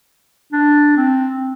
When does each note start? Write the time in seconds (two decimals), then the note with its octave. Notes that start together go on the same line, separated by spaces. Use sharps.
0.53 D4
0.97 C4